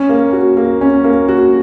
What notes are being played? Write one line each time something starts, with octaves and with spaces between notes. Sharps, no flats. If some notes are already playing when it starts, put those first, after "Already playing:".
Already playing: C#4
A#3
F#4
A#3
C#4
A#3
F#4